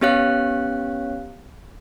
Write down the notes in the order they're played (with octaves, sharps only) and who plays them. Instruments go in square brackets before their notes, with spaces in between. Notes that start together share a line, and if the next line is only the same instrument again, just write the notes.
[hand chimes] B3 C#4 G4 C#5 F5 F#6